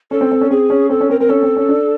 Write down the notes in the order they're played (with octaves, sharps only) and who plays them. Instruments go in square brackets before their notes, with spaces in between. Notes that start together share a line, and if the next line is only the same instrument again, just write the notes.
[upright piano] C#4 [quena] A4
[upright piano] C4
C4
C#4
[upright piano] C4 [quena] G#4
[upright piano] C#4
[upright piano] C4 [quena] A4
[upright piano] C#4
[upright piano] C4 [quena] A#4
[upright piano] C4 [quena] A#4
[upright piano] C#4 [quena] A4
[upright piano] C4
C#4
D4